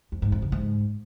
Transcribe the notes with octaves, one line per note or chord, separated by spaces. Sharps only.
F2
G#2
F2
C#3
G#2